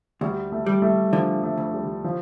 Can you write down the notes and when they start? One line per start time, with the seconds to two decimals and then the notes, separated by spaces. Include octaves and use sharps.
0.21 D2 G3
0.52 A3
0.66 G3
0.82 A3
1.13 D3 F3
1.43 A3
1.58 D2
1.74 G3
2.04 F3